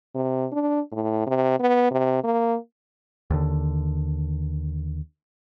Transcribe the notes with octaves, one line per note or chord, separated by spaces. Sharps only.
C3
D4
A2
C3
B3
C3
A#3
D#2 D3